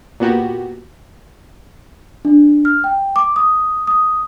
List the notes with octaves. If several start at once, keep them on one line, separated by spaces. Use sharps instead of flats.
A#2 B3 F#4 G4
D4
F6
G5
D6
D#6
D#6